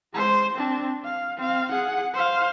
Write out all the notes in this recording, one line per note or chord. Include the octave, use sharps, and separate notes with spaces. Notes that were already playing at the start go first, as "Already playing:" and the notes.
G#3 C5
C4 D4
F5
C4 F5
G#4 F#5
C5 F5